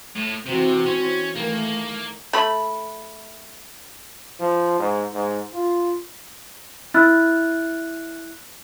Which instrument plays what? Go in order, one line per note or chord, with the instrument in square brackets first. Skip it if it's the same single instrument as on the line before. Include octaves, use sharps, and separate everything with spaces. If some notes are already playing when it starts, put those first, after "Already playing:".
[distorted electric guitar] A2
[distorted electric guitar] C3 [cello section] E3 C4 F#4
[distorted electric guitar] C#4
[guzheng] D#3 E3 [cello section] A3 [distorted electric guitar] A#3
[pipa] A3 B5
[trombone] F3
G#2
G#2
F4
[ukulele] E4 [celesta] F6 F#6 A6